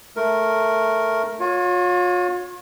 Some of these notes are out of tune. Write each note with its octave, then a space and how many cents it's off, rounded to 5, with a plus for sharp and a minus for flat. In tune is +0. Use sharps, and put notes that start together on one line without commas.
A3 +0 A#4 +0
F4 +40 C#5 +0